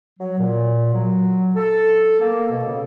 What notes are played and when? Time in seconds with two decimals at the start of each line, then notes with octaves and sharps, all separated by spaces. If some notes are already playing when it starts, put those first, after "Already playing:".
0.19 F#3
0.39 A#2
0.94 F#3
1.56 A4
2.19 A#3
2.51 B2
2.65 C#3